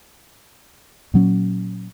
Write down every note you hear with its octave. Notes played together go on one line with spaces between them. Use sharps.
A#2 F#3 C#4